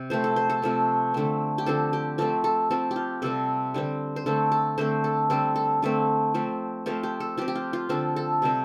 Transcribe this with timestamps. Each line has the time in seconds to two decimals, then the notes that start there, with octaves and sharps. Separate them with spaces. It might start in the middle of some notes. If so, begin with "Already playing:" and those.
Already playing: C3
0.10 F3 A3 C4 C5
0.24 A4
0.36 C5
0.50 A4
0.62 C3 F3 A3 C4
1.14 D3 A3 C4
1.58 G4
1.66 D3 F3 C4 A4
1.93 G4
2.18 F3 A3 C4 A4
2.44 A4
2.71 F3 C4 A4
2.91 G4
2.96 F4
3.22 C3 G3 C4 A4
3.74 D3 G3 C4
4.16 C5
4.26 D3 A3 C4 A4
4.52 A4
4.78 D3 A3 C4 C5
5.04 A4
5.30 D3 G3 C4 A4
5.56 A4
5.82 D3 A3 C4
6.34 F3 A3 C4
6.86 F3 A3 C4 F4
7.03 G4
7.20 A4
7.38 F3 C4 G4
7.48 G4
7.55 F4
7.73 F4
7.89 D3 F3 C4 A4
8.16 A4
8.42 C3 G3 C4